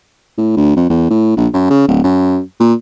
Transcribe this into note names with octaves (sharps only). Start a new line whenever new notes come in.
A2
D2
F2
E2
A2
A#1
F#2
C#3
D1
F#2
A#2